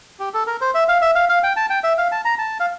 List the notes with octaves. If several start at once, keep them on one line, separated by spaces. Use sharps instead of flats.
G4
A4
A#4
C5
E5
F5
E5
F5
F5
G5
A5
G5
E5
F5
A5
A#5
A5
F5